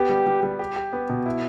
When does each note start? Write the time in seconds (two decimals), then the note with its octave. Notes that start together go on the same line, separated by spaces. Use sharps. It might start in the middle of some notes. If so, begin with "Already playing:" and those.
Already playing: B3 G4
0.09 G3
0.26 G3
0.43 G3
0.59 G4
0.76 G4
0.93 B3
1.09 B2
1.26 E4